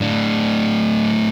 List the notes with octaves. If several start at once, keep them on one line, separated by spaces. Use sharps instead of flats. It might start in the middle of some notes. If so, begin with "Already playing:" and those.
A2 D4